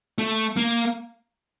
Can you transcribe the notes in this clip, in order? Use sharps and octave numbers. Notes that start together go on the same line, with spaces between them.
A3
A#3